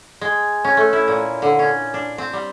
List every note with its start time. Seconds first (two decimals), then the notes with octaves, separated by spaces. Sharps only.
0.21 G#3
0.65 C#4
0.77 A3
0.93 E4
1.08 A#2
1.42 D3
1.59 C#4
1.94 D4
2.18 C4
2.33 G3